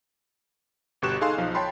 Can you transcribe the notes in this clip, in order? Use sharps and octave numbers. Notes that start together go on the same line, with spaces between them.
G1 B2 G4 C#6 F#6 E7
D#4 G#4 A4 F5 G#5 C6
B1 F3 D#4 F5
C#5 G5 A5 B5 C6